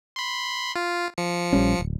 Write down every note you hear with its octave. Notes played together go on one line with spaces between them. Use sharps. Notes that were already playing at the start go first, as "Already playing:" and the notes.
B5 C6
F4
F3 C#7
A#1 G3 C#4
D1